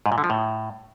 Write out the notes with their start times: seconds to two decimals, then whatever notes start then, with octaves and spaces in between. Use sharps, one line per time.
0.06 G#2
0.12 A#2
0.18 D3
0.24 F3
0.30 A2